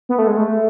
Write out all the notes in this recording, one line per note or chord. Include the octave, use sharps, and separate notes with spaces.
B3
A3
G#3
A3